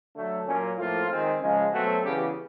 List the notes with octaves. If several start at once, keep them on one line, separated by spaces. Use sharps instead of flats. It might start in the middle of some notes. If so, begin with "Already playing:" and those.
D3 F#3 A3
A#2 F#3 A#3 C#4
A2 F3 A#3 F4
D#3 G#3 C4
C#3 F3 G#3
B2 F#3 A3 C4 F#4
C#3 E3 G3 B3 G4